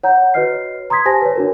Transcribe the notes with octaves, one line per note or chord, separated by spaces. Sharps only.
C#5 F#5 A#5 G6
F#4 B4 C#5 D#5 F6 C7
A#5 C6 D#6 G#6 B6
G4 C5 G#5 A5 A#6
B4 C#5
D4 F#4 A#4